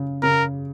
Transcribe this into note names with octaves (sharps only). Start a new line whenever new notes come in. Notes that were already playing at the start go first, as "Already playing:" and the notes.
Already playing: C#3
C#3 A#4